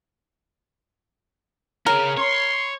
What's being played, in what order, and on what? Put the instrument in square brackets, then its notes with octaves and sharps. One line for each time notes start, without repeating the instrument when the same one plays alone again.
[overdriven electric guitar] C#4 G#4 [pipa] A#4
[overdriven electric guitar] C#5 [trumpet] C6